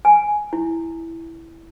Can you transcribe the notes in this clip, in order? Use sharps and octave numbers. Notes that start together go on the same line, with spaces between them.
G#5
E4